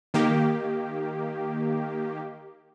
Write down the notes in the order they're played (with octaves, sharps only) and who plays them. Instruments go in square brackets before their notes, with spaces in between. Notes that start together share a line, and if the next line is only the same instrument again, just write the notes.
[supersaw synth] D#3 A#3 G4